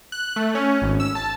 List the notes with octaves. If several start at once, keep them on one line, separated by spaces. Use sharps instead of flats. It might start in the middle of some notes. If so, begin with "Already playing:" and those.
F#6
A3
C#4
G#1
E6
A5